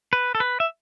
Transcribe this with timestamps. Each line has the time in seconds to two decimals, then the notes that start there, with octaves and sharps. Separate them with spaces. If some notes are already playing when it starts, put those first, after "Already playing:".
0.13 B4
0.35 A4
0.40 B4
0.60 E5